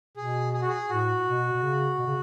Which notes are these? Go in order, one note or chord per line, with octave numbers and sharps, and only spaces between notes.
B2 G#4
G#4
F#4
G#4
A2 F#4
B2
B2
C#3
B2
C#3